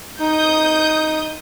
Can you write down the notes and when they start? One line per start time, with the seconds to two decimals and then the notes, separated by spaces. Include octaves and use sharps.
0.19 D#4 D#6 G6